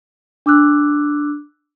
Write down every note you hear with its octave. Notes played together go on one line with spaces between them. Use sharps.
D4 D6 E6 F#6